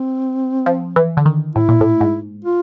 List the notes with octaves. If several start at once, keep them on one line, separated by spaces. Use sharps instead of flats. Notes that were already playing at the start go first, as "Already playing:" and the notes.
Already playing: C4
F3
E3
D3
D#3
A2 E4
A#2
A2
G#2
F4